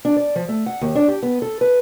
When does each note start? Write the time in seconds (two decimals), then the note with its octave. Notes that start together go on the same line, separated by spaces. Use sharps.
0.05 D4
0.17 D5
0.36 F3
0.48 A3
0.66 F#5
0.81 D#2
0.95 D4
1.08 G4
1.23 B3
1.42 A4
1.61 B4